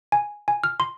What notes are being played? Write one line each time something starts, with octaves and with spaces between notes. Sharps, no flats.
G#5
G#5
F6
C6